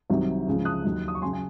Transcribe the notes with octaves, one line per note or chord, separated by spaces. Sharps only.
C2 C3 D#3 F#3
C#2 C#3 F3
D#6 F#6
D#2 D#3 F#3
D#6
C#6
C#3 F#3 G#5 C6
G#5